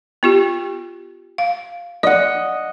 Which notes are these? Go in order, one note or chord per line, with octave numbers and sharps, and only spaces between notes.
B3 F4 G4
F5
D5 D#5 F#5